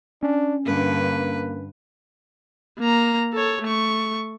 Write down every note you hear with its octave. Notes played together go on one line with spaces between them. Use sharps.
C#4 D4
G2 D3 A#3 B4
A#3 A#5
A4 C#5
A3 C#6